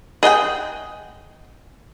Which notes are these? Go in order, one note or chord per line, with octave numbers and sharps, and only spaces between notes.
G#4 D#5 F#5 G5